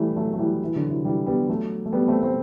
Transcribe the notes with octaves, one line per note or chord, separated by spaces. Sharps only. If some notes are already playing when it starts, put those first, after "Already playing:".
Already playing: E3 G3 A3
F#3 A3
A3
E3 G3
E3
D3 F#3
C3 E3
E3 G3
G3 B3
F#3 A3
A3
G3 B3
A3 C4
A3 C4